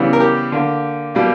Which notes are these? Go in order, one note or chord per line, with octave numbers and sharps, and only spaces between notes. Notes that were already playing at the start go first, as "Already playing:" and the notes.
Already playing: C#3 E3 G3 B3
A#4
G4
D3 A#3
B2 G3 A#3